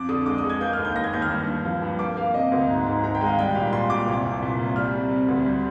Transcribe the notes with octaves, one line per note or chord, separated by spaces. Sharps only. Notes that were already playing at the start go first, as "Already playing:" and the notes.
Already playing: F2 D6
D3 D#6
G#3 D6
D#6
G#3
G#6
A#3 G6
F6
D#2
G6
D#2 A#6
G#6
D#2 G6
F6
G2
G2
F3
G2
A#3 D6
A#3 F5
C3 D#5
D2
G#2
G#2
D#3 A#5
G5
G#3
F5
G3 G5
A#2 F5
A#2 C6
A#2 D6
C2
C2
A#2
C2
G3 F6
C3
C3
D2
G3